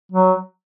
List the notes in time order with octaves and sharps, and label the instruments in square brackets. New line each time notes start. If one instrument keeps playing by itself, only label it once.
[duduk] F#3